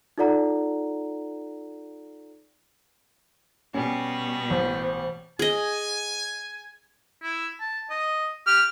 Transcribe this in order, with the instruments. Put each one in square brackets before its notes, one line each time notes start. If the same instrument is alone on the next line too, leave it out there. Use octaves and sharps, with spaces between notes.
[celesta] D#4 F4 A4 D5 F#5 A#5
[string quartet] B2 G3 [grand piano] C#4
[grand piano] A1 [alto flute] C5
[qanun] G#4 D#5 [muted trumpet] G#5
[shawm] E4
A5
D#5
[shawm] G4 [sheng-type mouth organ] F6